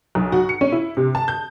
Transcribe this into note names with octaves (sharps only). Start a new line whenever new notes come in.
B1
F#4
C#7
C#4
E4
C3
A5
G6